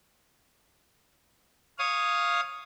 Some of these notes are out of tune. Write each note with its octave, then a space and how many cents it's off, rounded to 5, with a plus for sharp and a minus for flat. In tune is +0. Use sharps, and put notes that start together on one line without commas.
C#5 -5 F5 +0 D#6 +0